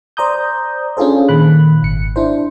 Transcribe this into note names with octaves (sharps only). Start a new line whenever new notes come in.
C5 D5 A#5 D#6 G6
C#4 D4 F4 G#4 A4 C5
A#2 D#3 B5 F#6
G#1 C#7
D4 E4 C5